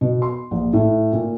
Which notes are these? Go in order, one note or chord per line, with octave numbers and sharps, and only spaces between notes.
B2
C6
A#1
A2
A#2